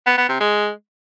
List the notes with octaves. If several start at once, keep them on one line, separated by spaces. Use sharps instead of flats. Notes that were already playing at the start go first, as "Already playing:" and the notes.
B3
B3
C3
G#3